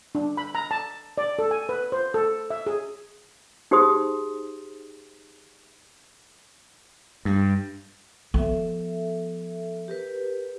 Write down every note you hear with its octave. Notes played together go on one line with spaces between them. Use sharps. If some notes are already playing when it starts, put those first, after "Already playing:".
D4
B5
A#5
A5
D5
A4
G#5
B4
C5
A4
E5
G#4
D#4 G4 G#4 C5 C6 D#6
G2
F3 B3 A4 E5
G4 A#4 B4